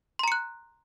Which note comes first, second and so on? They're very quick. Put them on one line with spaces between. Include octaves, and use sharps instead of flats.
C6 A#5 C#7 F#6